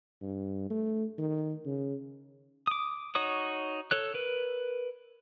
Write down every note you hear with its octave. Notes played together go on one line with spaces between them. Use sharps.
G2
A3
D#3
C#3
D6 D#6
D#4 F#4 C#5 C#6 D#6
A4 C#5 F#6
A#4 B4